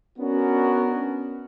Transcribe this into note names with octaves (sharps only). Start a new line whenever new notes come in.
B3 C#4 D4 F#4 A#4